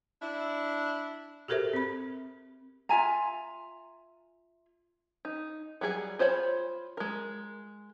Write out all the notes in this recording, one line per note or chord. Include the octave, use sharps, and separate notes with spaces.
D4 E4
F#4 G4 A4 A#4 C5 E5
C4 B5
F4 E5 G#5 A#5
D#4
F#3 G3 G#4 A4 G#5
F4 C5 C#5 F5 B5
G#3 A#4